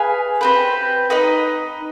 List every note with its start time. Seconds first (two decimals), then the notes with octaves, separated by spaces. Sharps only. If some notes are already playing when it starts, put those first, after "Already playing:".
Already playing: G#4 B4 F5 G#5
0.41 C4 G4 B4
1.10 D#4 B4 D#5